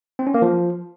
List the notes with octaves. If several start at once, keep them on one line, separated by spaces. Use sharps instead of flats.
C4
C#4
A#3
F3